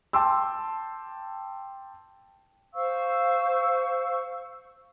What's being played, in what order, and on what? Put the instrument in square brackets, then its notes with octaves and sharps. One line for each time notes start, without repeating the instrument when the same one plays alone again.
[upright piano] G5 A5 C6 D6 E6
[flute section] C5 F5 C#6 E6